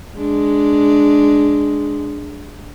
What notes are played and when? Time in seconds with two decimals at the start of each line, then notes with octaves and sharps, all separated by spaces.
0.17 G#3 D4